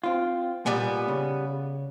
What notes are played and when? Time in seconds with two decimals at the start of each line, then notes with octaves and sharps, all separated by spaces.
0.04 C4 F4
0.66 A#2 G3 B3 G#5
1.08 C#3